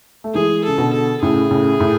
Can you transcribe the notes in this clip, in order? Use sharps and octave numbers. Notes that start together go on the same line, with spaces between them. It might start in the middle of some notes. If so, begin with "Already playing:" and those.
A3
E3 G#3 G#4
C#3 A4
B2 D3
A4
A2 C#3 G#4
A2 C#3
A2